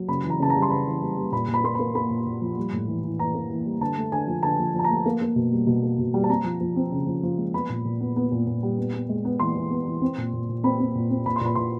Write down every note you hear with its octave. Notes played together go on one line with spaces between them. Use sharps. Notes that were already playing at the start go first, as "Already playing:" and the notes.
Already playing: F#3
C#3 B5
E3
A#5
C#3 A5
A#5
G3
C6
C#3 B5
E3
G3
G3
A#2 B5
A#2
B5
A#3 C6
A#3 B5
A#3 B5
A#2
A#2
F3
G3
A2
E3
E3
E3 A#5
A#3
E3
G3
D3 A5
A3
D3 G#5
F3
D3 A5
F3
F3
A5
A#5
A3
A#3
A#3
B2
G3
B2
A#3
B2
G3
A5
C4 A#5
F3
F3
C4
C#3
F3
F3
G#3
B3 B5
A#2
A#2
B3
B3
A#2
A#2
G3
B3
B3
G#3
B3
E3 C6
E3
B3
E3
C4
A#2
A#2
A#2
C4 B5
C4
A#2
C4
A#2 B5
C6
A#2 B5
A#2 C6